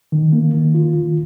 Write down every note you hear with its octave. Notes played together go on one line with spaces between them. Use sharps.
D#3
A#3
D#3
F4
D#3